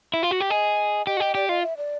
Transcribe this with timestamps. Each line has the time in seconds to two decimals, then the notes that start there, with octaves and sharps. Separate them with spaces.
0.14 E4
0.23 F4
0.31 F#4
0.41 G4
0.50 G#4 D#5
1.07 G4 D#5
1.17 F#4
1.20 G4
1.35 G4 D5
1.49 F4 D#5
1.63 E5
1.77 D5